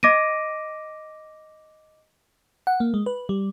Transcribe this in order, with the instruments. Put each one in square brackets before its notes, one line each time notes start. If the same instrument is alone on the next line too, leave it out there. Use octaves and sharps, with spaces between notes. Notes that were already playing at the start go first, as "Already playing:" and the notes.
[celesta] D#5 D6 A#6 D7 D#7
[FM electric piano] F#5
A#3
G#3
B4
G3